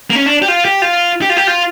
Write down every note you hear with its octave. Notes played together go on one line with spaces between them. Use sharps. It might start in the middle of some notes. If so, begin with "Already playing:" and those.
A#3
C#4
D4
G4
F4
G4
F4
G4
F4
G4
F4